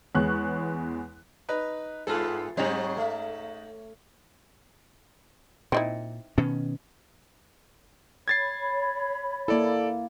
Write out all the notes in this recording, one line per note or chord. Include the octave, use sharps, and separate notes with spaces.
E2 G#3 B3 C#5 C#6 F#6
D#4 B4
G2 B3 F4 G#4 A4
G#2 F#3 C4 D#4 C#5
A3
A#2 C4 D#4 E4
B2 D#3 C#4
C#5 B5 G#6 A6 C7
A#3 E4 A4 D5